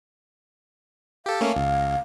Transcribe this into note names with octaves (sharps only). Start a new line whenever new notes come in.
G4 A4 F5
A3 A#3 C#4
C#2